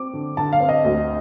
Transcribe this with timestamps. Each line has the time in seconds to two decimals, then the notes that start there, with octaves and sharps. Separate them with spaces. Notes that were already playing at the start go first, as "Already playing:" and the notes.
Already playing: C4 D6
0.13 D3
0.37 D3 A5
0.53 F5
0.60 C4
0.69 D#5
0.84 D2